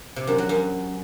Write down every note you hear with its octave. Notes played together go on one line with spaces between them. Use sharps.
C3
F#2
F#3
F#2